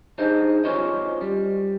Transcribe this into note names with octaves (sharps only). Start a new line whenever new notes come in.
D4 D#4 G#4 C5 D#5
C#4 F4 F#4 C5 C#5 D#5
G3